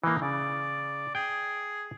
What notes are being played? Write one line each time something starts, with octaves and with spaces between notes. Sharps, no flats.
E3 A#3 D#4
C#3 D5
G#4 G5